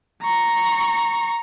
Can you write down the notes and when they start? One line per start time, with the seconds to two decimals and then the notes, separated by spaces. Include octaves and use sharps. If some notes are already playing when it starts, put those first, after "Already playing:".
0.22 A#5 C#6